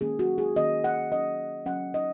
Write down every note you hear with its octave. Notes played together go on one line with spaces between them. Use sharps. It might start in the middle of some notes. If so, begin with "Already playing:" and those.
D#3 A#3 C#4 G#4
F#4
G#4
D#3 A#3 C#4 D#5
F#5
F#3 C#4 D#5
F#3 C#4 F#5
D#5